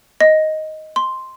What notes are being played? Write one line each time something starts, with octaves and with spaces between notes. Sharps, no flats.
D#5
C6